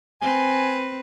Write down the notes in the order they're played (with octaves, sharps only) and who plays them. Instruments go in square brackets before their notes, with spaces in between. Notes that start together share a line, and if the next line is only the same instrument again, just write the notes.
[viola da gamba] C4 B4 [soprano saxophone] G#5